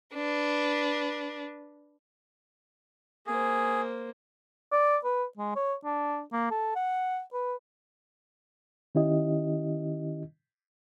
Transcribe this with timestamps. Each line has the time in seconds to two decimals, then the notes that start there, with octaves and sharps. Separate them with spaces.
0.14 D4 B4
3.27 A#3 G#4 C5
4.72 D5
5.05 B4
5.38 G#3
5.56 C#5
5.85 D4
6.33 A#3
6.51 A4
6.75 F#5
7.33 B4
8.95 D#3 C#4 E4 G4 D#5